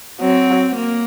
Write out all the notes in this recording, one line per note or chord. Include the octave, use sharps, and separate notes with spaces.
F#3 C4
A#3